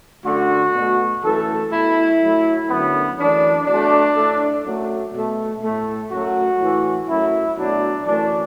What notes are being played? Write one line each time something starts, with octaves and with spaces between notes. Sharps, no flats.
F#2 D3 A3 F#4
B2 A3
F#2 E3 A3 A4
B2 A3 E4
A2 F#3 A3
F#2 D3 F#3 A3 B3
F#2 E3 A3 D4
B2 F#3 A3 D4
A2 A3
F#2 F#3 A3
B2 A3
A2 A3
F#2 F#3 A3 F#4
A2 E3 A3
F#2 F#3 A3 E4
B2 F#3 A3 D4
F#2 E3 A3 D4